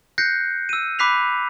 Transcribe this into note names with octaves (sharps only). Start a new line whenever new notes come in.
F#6 G6 A#6 C7 C#7
E6 D#7
B5 D6 F#6 B6 C7 F7